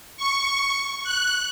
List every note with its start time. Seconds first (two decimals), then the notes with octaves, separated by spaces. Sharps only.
0.17 C#6
1.04 F#6